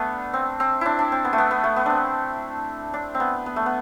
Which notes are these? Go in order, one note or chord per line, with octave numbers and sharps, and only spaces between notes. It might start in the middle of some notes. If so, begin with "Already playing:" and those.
Already playing: A3 B3 D4
C4
C4
D4 E4
D4
C4
B3
A3
B3
B3
A3
B3
C4 D4
D4
C4
B3
B3
A3
B3